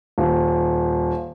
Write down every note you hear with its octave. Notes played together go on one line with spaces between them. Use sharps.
D#1